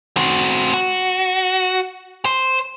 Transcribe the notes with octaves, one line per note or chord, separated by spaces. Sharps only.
C4 F#4
F#4
C5